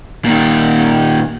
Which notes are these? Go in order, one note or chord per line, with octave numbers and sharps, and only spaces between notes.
A#2 D#3